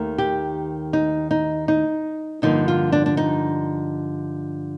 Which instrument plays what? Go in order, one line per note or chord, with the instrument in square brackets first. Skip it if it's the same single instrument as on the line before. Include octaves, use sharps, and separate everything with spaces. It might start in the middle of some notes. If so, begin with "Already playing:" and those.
Already playing: [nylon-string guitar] D#2 D#3 A3
G4
D#4
D#4
D#4
G2 D3 F3 A#3 D#4
F4
D4
D4
D#4